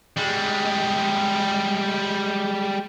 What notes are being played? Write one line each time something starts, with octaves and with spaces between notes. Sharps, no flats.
G3 G#3